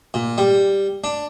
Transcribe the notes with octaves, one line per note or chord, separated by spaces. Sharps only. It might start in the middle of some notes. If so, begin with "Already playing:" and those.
A#2
G3
D4